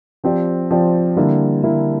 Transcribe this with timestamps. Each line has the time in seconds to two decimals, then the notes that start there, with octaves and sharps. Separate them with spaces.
0.24 F3 C4 G4 D5
0.71 F3 C4 G4 D5
1.16 D3 G3 A#3 E4
1.63 D3 G3 A#3 E4